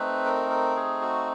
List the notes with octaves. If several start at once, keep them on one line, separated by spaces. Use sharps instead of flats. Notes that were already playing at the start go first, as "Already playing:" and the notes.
Already playing: A3 C4 D#4 B4
A#4
A#4
G#4
F#4